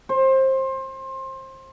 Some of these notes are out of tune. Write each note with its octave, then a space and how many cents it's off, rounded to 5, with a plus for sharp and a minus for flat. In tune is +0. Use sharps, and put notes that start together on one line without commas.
C5 +25